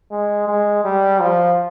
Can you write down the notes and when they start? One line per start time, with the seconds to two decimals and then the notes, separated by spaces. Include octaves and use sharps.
0.11 G#3
0.48 G#3
0.85 G3
1.21 F3